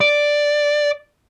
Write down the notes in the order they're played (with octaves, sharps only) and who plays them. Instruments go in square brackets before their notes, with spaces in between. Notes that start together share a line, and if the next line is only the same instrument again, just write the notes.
[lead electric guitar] D5